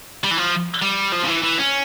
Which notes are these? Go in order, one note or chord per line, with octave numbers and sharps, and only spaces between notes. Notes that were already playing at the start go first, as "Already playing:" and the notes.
G3
E3
F3
G3
F3
C#3
E3
E3
C#4